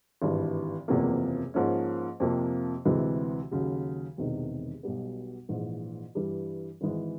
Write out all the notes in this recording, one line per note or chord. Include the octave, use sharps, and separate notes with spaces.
G#1 G2 E3
F#1 E2 C3 F3 A#3
G#2 F3 A#3 C#4
F2 C3 F3 A#3
D2 C3 E3 G#3
D#2 C#3 F#3
E1 E2 C3 D#3
B1 B2 G3 B3
A#1 G#2 E3
G2 E3 G3
G#1 G#2 E3 G#3